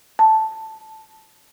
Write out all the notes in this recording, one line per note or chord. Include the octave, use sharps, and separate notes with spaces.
A5